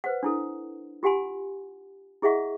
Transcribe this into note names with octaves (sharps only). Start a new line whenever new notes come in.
B4 C5 F#5
D4 E4 A4
F4 G4 F#5 G#5 C6
E4 G#4 D#5 E5 F#5 C#6